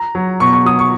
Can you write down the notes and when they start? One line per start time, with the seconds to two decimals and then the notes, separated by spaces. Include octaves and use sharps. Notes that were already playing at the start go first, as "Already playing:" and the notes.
Already playing: A#5
0.15 F#3
0.40 B2 C#6
0.53 C#6
0.65 F#3 D#6
0.79 C#6